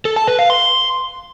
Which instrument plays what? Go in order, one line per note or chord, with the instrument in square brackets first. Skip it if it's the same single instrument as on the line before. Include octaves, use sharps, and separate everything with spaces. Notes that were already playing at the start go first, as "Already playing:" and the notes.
[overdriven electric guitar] A4
A5
B4
F5
C6